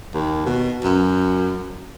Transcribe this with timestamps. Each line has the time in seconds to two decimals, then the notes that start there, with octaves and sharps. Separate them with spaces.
0.14 D#2
0.46 B2
0.84 F#2